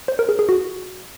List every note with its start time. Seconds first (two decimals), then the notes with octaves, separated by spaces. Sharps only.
0.08 C5
0.19 A#4
0.29 G#4
0.39 G#4
0.49 F#4